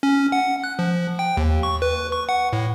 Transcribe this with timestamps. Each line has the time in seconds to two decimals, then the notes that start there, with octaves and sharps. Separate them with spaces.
0.03 C#4
0.32 F#5
0.64 F#6
0.79 F3
1.19 G5
1.37 D#2
1.63 C#6
1.82 B4
2.12 C#6
2.29 F#5
2.53 A2